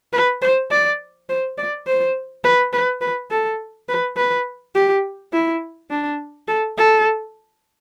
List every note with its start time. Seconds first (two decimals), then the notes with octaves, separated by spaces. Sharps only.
0.13 B4
0.42 C5
0.71 D5
1.29 C5
1.58 D5
1.87 C5
2.44 B4
2.73 B4
3.01 B4
3.31 A4
3.89 B4
4.17 B4
4.75 G4
5.33 E4
5.90 D4
6.48 A4
6.78 A4